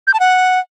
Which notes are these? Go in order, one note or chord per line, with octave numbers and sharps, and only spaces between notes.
G6
A5
F#5